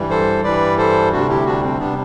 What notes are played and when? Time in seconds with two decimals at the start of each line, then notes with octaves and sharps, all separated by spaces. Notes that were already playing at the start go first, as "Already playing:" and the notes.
Already playing: G2 E3 G3
0.10 A4 C5
0.44 G2 E3 G3 B4 D5
0.78 A4 C5
1.12 D2 C3 G3 D4 F#4
1.29 E4 G4
1.45 D4 F#4
1.63 C4
1.79 C3 G3 B3 D4